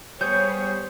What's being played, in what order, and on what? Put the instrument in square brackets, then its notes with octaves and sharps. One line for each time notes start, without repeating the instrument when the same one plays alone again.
[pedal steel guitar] G3 G#4 [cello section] B3 C#5 [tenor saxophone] C5 [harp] G6